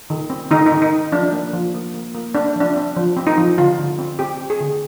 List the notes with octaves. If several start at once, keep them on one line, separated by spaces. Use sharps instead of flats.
D#3
C4
D#3 D#4
D#4
D#3
D#4
D#3
F3 D4
A#3
F3
A#3
A#3
A#3
C4 D4
F3 D4
C4
F3
C4
D#4
F3
D3 F4
D3
C4
C4 G4
C4
G#4
D3